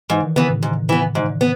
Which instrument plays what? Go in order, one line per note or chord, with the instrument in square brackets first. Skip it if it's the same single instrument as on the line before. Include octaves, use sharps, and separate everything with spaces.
[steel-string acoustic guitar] G#2 [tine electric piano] E3
[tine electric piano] D#3
[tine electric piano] C#3 [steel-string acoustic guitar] E3 B3
[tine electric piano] A2
[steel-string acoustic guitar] G#2
E3 B3
G#2
B3